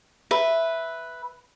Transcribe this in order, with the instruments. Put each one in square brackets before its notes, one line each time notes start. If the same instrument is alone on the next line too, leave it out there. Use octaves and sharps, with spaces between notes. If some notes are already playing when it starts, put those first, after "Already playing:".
[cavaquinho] B4 E5